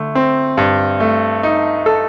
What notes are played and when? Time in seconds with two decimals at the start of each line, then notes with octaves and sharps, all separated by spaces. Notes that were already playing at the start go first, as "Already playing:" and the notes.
Already playing: D3 A3
0.15 C4
0.57 G2
1.00 A3
1.43 D#4
1.86 A4